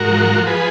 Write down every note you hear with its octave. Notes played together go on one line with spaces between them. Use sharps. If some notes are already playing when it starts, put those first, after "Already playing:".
Already playing: G#2 F#4 A#4
F3
F3
G#4 B4